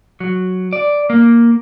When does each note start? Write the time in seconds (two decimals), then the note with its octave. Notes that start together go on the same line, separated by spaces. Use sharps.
0.20 F#3
0.73 D5
1.10 A#3